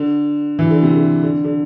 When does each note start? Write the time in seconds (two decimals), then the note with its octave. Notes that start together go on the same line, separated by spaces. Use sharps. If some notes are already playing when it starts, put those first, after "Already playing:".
Already playing: D3
0.59 E3
0.71 D3
0.83 C3
0.95 D3
1.23 D3
1.44 D3